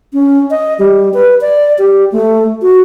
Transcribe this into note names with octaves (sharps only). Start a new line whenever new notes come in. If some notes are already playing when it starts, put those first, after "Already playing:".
C#4
D#5
G3
B4
D5
G4
A3
F#4